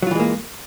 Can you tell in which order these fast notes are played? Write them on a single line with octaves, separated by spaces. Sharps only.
F#3 F4 E3 G#3 A#3